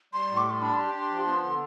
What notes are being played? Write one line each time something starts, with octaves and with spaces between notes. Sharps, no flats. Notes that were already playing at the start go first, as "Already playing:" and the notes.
G3 C6
A2
D6
G3 C6
D4 B5
G4 C6
D4
F3
B3
D3